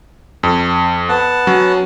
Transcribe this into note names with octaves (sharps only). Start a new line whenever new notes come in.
F2
B3 F#5 A5
F#3 C#4